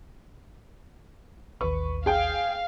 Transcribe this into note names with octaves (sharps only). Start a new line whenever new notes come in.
A1 D#2 B4 C#6
G#4 F5 G5